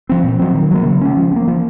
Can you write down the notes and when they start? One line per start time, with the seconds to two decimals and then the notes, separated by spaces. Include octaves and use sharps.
0.09 F3 C4
0.24 A#2
0.39 F#3 C4
0.55 D#3
0.71 F#3 A#3
0.86 C#3
1.01 G#3 C#4
1.17 F3
1.32 C#4
1.36 A#3
1.47 F3